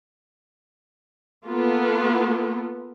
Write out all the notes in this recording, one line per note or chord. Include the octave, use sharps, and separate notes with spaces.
A#3 B3 F4 A4